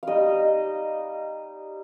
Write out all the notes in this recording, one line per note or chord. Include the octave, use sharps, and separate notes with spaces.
G3 D#4 D#5 F5